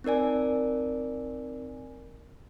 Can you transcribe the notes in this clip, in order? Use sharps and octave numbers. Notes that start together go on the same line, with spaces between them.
C4 D#4 A#4 D5 G#5